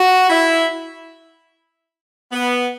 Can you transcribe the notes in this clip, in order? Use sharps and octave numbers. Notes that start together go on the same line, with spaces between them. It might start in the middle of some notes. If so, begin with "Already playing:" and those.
Already playing: F#4
E4
B3